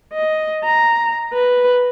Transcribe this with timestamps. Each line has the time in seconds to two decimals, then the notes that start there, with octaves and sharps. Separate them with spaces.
0.13 D#5
0.65 A#5
1.33 B4